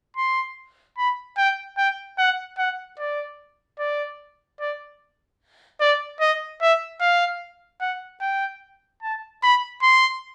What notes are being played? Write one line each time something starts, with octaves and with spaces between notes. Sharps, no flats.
C6
B5
G5
G5
F#5
F#5
D5
D5
D5
D5
D#5
E5
F5
F#5
G5
A5
B5
C6